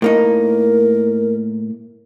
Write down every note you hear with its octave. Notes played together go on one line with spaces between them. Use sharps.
A2 A#3 D#4 A#4